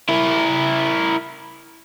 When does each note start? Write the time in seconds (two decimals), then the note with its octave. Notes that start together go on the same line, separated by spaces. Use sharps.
0.09 E4 A#4